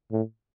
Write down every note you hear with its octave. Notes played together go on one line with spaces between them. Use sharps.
A2